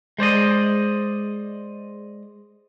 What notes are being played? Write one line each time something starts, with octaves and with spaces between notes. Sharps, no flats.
G#3 C5 D5 D#5